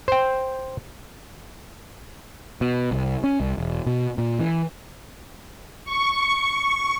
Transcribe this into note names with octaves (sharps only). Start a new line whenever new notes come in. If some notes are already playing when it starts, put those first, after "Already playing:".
C5 G5
B2
C2
C#4
C2
E1
B2
A#2
E3
C#6